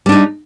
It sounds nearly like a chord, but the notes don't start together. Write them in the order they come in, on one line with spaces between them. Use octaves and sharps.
G3 D4 D#4